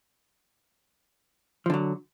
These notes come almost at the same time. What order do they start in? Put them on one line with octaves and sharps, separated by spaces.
F3 D3 F#3